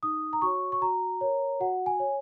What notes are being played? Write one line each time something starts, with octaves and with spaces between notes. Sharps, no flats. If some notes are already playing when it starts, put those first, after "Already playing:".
D#4 D#6
A#5
F#4 C#5 C#6
C#6
F#4 A#5
A#4 C#5
F#4 F#5
G#5
C#5